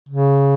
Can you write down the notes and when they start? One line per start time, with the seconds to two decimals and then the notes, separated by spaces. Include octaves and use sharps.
0.09 C#3